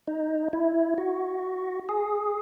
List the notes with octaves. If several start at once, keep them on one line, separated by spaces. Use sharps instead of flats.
D#4
E4
F#4
G#4